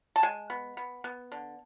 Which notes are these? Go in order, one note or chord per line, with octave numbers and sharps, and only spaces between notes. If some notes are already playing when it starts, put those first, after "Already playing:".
A5
G#3 G#5
B3
B3
B3
D3